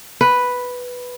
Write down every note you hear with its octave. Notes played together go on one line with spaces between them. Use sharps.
B4